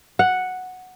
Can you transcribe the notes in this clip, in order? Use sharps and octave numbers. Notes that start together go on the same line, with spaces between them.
F#5